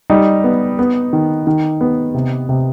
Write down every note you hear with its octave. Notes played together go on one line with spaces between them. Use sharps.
G3 D#4
B3
B3
D#3
D#3
B3
C3
C3